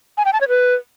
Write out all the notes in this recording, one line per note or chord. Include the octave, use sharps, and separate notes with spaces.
G#5
G5
A5
C#5
B4